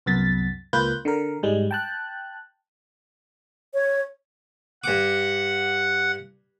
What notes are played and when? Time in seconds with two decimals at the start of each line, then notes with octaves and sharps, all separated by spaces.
0.06 C2 F#2 B3 A6 B6
0.73 C#2 A#3 F4 B4 F#6 G6
1.05 D3 A#4
1.43 G#2 G3 G#3
1.71 G5 A5 F#6
3.74 C#5
4.84 G2 F#5 D6